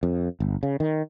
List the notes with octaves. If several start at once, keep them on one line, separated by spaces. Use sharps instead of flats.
F2
G1
C#3
D#3